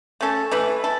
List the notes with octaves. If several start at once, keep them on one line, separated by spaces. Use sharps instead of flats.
A3 C#4 A4
E3 A3 E4 B4
E4 A4